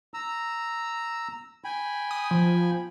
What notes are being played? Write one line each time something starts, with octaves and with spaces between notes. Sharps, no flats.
A#5 E6
G5 G#5 B5
D#6
F3